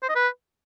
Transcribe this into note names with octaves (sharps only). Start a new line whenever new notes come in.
C5
D#5
B4